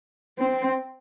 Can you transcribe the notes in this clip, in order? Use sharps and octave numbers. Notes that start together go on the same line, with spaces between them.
C4